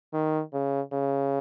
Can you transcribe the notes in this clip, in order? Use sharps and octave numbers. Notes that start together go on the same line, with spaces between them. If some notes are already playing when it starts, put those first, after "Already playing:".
D#3
C#3
C#3